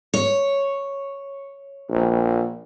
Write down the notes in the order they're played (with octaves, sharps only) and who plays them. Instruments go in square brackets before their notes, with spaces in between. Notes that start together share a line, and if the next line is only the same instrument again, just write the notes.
[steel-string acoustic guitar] C#5
[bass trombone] A#1